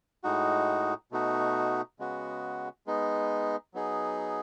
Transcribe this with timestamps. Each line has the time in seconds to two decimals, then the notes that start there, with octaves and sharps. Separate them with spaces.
0.24 A2 G#3 D#4 F#4
1.12 B2 A3 D#4 F#4
1.99 C#3 G#3 B3 F#4
2.86 G#3 B3 D#4
3.74 F#3 B3 D#4 G#4